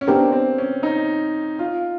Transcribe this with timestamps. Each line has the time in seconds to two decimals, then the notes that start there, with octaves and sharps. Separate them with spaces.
0.01 C#4
0.07 B3 C4 D4 G4 A#4
0.32 C4
0.58 C#4
0.83 D#4
1.59 F4